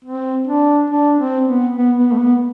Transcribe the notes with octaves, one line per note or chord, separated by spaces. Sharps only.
C4
D4
D4
C4
B3
B3
B3
A3
B3